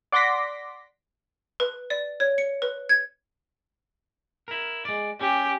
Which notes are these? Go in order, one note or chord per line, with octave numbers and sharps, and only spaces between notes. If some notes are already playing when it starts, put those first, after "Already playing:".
D5 F#5 C6 D6 A#6 B6
B4
D5
C#5
C#7
B4
G#6
E4 A#4
G#3 D5
G3 C#4 G4